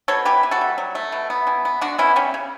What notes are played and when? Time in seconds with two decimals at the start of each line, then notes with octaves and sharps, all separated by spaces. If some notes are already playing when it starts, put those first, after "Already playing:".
0.08 B2 A4 C#5
0.25 E3 G4 B4
0.43 E3
0.51 F#4 A4
0.61 G3
0.78 F#3
0.95 A3
1.12 B2
1.30 B3
1.47 E3
1.65 B3
1.81 D3 D4 F#4
1.98 B3 C#4 E4
2.16 G3 C#4
2.34 C#3